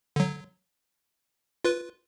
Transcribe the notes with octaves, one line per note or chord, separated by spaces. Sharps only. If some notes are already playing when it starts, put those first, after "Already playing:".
D3 F#3
F4 B4